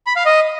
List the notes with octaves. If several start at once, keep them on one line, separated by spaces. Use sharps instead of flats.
B5
F5
D#5